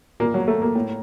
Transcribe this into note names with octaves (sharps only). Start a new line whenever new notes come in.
A#2 A#3
F#3
A3
A#3
A2